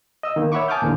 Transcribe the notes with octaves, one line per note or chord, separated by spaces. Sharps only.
D#5 E6
D#3 A#3
C#5 E5 F#5 B5 C#6 D6
G#5 A5 D6 D#6 F6 G6
D#2 A#2 D3 E3